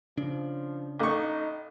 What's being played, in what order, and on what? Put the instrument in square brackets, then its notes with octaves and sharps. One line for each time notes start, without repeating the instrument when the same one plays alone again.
[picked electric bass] C#3 D4 [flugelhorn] F3
[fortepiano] A1 C#6 [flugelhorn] D#4 [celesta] A4 F5 D6